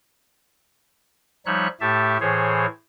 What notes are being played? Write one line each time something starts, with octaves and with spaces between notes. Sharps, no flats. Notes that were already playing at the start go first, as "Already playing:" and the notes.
F3 G3 D#4 C#5 E5 F#6
A2 A3 G4 E5 A5
A2 E3 G#4 C5 C#5